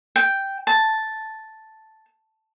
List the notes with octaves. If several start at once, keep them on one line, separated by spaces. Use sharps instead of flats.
G5
A5